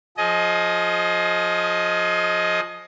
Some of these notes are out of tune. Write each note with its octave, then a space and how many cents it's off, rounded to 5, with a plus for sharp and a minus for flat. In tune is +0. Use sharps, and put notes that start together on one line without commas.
F3 +15 G#4 +30 D#5 +5